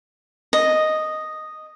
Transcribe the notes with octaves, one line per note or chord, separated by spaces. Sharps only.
D#5